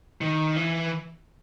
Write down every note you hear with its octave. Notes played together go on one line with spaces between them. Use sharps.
D#3
E3